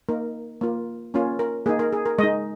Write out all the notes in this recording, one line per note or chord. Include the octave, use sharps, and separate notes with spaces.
A#3 D#4 A#4
A#3 F4
A#3 C#4 F4
A#4
A#3 D#4 G#4
A#4
G#4
A#4
G#3 D#4 D#5